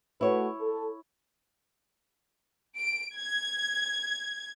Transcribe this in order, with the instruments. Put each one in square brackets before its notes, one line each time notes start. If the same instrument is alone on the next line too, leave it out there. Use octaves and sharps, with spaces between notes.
[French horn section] A3 F#4 B4 [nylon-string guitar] E4 C#5
[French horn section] A4
[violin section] D7
G#6